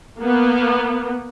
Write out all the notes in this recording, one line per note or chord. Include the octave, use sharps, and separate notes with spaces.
A#3 B3